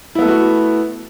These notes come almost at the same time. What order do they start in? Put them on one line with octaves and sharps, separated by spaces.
E4 B3 A4 A3 F#4